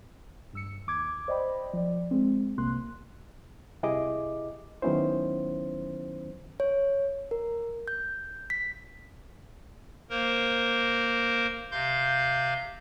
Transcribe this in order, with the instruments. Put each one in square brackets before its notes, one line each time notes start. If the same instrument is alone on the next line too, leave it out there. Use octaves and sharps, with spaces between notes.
[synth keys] G2 E6 C#7
D#2 D6 G#6
C5 D5 D#5 G5 B5
F3 D5
G#3 C4
G1 C2 C3 A#3 C6 F#6
[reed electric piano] C2 E4 G4 G#4 D#5 D6
D#3 F#3 B3 C#4 E4 C5
[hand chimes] C#5
A#4
G6
B6
[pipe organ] A#3 A#4 C5
C3 F5 C6 G6